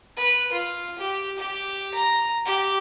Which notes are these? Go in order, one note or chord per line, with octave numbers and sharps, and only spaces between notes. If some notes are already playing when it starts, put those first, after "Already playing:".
B4
F4
G4
G4
A#5
G4